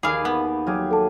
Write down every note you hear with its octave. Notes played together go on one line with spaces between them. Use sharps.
D#2 G#4 F5 G#5 B5 D6
B3
F#3 G4 G#4 F5
A4 A5